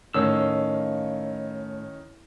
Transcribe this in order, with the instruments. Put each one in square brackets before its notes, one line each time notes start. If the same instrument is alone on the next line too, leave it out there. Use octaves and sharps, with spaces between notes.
[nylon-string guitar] A2 [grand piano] D#3 C#4 [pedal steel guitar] D#5 F5 E6